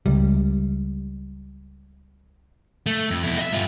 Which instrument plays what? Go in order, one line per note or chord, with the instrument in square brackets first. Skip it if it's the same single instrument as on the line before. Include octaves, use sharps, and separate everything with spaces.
[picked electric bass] C#2 G3
[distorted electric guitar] A3
F2
B2 E4
D#5 E5
G2 F4